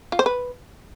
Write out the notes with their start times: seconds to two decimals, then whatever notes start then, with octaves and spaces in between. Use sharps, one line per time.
0.12 F4
0.19 C5
0.26 B4